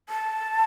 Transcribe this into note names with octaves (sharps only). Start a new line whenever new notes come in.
A5